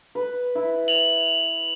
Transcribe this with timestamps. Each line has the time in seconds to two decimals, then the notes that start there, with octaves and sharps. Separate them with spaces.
0.15 B4
0.55 E4
0.88 F7 F#7